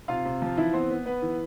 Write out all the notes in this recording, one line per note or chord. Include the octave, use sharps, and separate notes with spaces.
C3 F4 F5
C3
F3
E3 E4 E5
B3 C4 C5
B3
B3 B4
E3